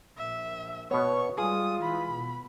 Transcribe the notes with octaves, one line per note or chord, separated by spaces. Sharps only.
A#1 A#2 E5
B2 B3 C#5 C#6
G3 G#3 F4 G#4 D#6
E3 B5
B2